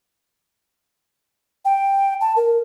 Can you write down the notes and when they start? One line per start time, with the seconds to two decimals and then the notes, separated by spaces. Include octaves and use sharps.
1.65 G5
2.21 A5
2.37 A#4